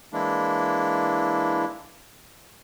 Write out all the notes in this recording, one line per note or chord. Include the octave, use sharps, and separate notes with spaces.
E3 G#3 A#3 D4 E4